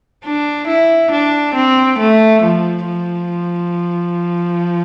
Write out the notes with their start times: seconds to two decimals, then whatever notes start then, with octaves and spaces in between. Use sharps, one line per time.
0.24 D4
0.68 E4
1.12 D4
1.55 C4
1.99 A3
2.42 F3
2.86 F3